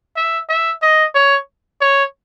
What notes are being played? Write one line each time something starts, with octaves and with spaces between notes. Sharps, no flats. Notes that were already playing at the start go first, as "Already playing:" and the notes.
E5
E5
D#5
C#5
C#5